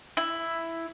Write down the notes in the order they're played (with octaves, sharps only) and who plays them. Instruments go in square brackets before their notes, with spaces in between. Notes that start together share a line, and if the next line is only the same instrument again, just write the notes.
[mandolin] E4